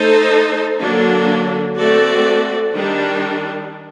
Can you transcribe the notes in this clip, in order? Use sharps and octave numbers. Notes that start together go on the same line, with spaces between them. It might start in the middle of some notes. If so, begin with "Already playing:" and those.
Already playing: A3 D#4 A4 C5
D3 F#3 A#3 D4
A3 C4 F#4 A4 D5
D#3 G3 D4